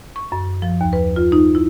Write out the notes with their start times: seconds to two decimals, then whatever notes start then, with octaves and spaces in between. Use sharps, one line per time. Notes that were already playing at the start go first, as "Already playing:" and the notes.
0.16 C#6
0.32 F#2
0.62 F3
0.81 D#2
0.93 B4
1.16 F4
1.32 D#4
1.55 E4